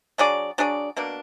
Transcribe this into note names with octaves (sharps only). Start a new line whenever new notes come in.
F#3 D4 G#4 D5
F#3 D4 G#4 D5
B2 A#3 D4